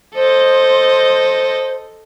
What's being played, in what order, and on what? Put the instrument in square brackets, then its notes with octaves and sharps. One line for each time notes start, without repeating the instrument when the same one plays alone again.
[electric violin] A4 D#5 [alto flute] C5